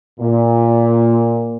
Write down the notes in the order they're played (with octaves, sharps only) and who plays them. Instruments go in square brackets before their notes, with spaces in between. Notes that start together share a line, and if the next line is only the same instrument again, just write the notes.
[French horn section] A#2